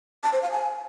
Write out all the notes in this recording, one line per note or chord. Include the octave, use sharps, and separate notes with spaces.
A5
C5
F5
G#5